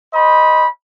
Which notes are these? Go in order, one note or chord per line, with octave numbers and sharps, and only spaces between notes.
C5 D#5 B5